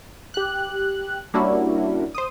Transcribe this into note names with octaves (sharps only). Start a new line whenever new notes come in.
G4 F#6
G3 A#3 C#4 D4 E4 F#4
C5 D#6